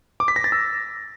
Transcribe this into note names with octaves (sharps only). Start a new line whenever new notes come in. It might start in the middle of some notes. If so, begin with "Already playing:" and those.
D6
B6
A#6
A6
E6